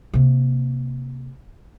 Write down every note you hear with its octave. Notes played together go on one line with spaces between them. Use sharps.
C3 A#3